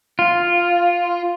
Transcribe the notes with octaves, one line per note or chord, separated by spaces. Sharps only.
F4